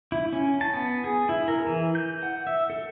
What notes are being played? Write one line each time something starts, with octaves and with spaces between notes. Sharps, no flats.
E4
C#4
A5
B3
G#4
E4
A#4
E3
G6
F#5
E5
A4